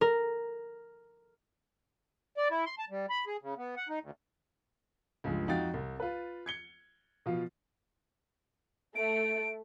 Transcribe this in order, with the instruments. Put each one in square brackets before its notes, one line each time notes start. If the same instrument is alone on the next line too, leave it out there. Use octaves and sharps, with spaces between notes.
[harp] A#4
[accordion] D5
E4
C6
A5
G3
B5
G#4
C#3
B3
F#5
D#4
D2
[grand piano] C#2 G2 F3 G#3
F2 D#4 F4 F#4 G5 A6
C2
F4 B4
G#6 C#7 G7
B2 F3 F4
[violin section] A3 [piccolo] D7